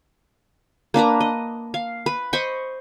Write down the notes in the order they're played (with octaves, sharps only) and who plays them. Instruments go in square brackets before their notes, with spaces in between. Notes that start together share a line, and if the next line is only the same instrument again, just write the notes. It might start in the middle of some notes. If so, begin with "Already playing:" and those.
[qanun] A#3 D4 B4 A#5
D#5
F5
B4
C5 D#5 B5 C#6